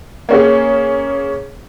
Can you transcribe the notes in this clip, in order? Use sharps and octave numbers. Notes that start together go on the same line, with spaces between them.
A#3 C#4 G#4